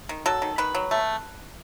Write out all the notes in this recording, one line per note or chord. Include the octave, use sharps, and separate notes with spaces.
D#3
F#3 A4
D#3
D#3 B4
F#3
A3